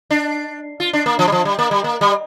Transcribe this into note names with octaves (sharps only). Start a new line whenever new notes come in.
D4
F4
D4
A#3
F3
G3
F3
G3
A#3
G3
A#3
G3